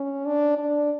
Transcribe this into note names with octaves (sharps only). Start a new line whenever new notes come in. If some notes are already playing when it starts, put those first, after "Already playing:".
Already playing: C#4
D4
D4